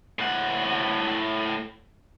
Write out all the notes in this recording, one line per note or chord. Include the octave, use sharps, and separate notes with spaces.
A2 F#5